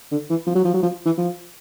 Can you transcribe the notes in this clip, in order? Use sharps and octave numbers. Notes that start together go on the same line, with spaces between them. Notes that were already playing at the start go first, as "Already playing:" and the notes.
D3
E3
F3
F#3
F3
F#3
F3
E3
F3